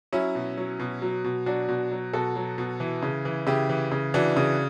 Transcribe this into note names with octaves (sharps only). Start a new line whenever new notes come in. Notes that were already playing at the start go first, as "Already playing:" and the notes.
F#3 C#4 E4
B2
F#3
B2
F#3
B2
F#3 D4 F#4
B2
F#3
B2 F#4 A4
F#3
B2
E3
C#3
E3
C#3 E4 G4
E3
C#3
E3 D4 F#4
C#3